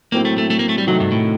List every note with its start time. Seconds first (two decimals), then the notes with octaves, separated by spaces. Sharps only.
0.12 A2 F#3 A#3 C4
0.25 A3
0.38 A3
0.50 A3
0.59 A#3
0.69 A3
0.78 G3
0.87 C3 D#3 F#3 A3 D#4 F#4
1.00 G2
1.12 A2